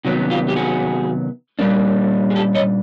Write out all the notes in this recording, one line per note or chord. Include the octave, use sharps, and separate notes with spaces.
C3 D#3 F#3 B3 F#4
F4 G4
G4
F#4 G#4
A#2 G3 A#3 D4
G#4
G4 A4
C#5 D#5